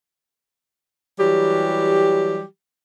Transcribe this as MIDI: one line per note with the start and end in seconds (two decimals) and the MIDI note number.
1.19 2.44 52
1.19 2.44 54
1.19 2.44 55
1.19 2.44 67